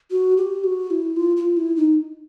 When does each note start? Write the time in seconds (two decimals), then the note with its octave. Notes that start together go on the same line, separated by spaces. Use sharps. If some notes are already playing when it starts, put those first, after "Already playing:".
0.11 F#4
0.37 G4
0.64 F#4
0.91 E4
1.17 F4
1.37 F4
1.57 E4
1.76 D#4